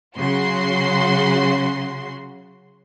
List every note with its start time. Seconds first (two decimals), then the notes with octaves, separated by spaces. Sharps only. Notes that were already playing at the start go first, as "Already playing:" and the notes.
0.18 C#3 F#3 F#4 C6